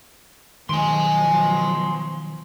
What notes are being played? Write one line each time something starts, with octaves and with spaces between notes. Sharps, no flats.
B2 D#3 F3 F#3 G#5 C6